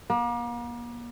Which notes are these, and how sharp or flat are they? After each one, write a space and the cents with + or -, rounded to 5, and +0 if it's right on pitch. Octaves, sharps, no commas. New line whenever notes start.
A#3 +40